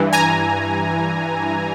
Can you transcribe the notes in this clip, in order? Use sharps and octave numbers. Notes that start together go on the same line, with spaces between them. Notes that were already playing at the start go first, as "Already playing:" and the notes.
Already playing: G2 E3
G#5 A#5